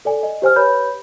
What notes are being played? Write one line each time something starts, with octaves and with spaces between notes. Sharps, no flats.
A4 D5 G#5
D#5
G4 C5 G#5 F6
G4 B4 C#5 B5 G6